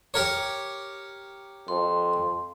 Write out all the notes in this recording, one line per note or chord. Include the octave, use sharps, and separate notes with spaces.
G4 A#4 C#5
F2 C6